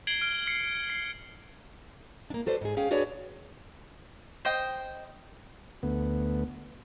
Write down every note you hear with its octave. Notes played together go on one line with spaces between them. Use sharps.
G#6 C7 D7 F#7 G7
F6 D7 G7
F6 C7 C#7
C7
A#3 D4
F#4 A4 B4 C5 D5
G#2 G#4
C#4 G#4 F5 G5
D4 F#4 G#4 B4 C#5 D5
C5 D#5 G5
D2 B3